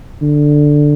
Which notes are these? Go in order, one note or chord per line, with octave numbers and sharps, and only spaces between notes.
D3